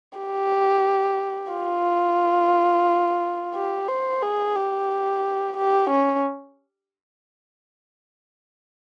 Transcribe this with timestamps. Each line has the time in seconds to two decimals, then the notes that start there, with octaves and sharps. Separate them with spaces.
0.19 G4
1.52 F4
3.55 G4
3.88 C5
4.23 G#4
4.56 G4
5.57 G4
5.90 C#4